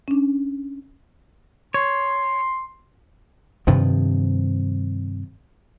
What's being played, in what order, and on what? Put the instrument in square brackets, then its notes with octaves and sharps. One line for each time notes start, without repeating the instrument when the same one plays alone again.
[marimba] C#4 D4
[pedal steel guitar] C#5 [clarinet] C6
[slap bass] G2 C3 D#3 F3